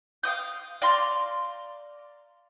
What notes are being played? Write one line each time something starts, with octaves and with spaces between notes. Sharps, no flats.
F5 G5 D#6 G6
D5 F5 A#5 C6